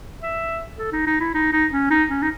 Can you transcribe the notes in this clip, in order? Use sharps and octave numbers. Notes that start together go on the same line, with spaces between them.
E5
A4
D#4
D#4
E4
D#4
D#4
C#4
D#4
C#4
D#4